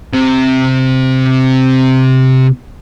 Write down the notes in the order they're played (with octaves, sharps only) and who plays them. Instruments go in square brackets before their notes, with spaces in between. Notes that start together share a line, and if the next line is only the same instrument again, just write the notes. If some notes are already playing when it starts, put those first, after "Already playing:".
[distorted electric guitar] C3 C4